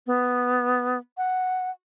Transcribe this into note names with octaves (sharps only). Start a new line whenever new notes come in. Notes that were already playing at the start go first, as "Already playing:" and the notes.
B3
F#5